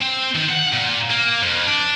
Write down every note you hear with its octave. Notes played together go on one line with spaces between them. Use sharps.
C4
D#3
F#5
A#2
A#3
F2
D4